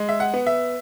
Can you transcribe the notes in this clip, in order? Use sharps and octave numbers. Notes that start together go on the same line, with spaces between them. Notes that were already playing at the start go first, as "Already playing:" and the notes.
Already playing: G#3
E5
F#5
B3
E5